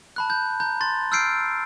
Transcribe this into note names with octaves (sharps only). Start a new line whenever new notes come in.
A5 B5 F#6
G6
A#5 G6
C6 A6
E6 F6 G6 C7 D7